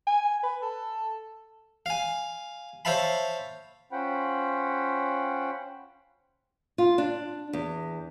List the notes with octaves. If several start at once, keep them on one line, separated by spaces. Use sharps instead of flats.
G#5
B4
A4
F5 G#5
C5 C#5 E5 F5 A5 B5
C#4 F4 C5 F#5 G5 B5
F4
D4
E2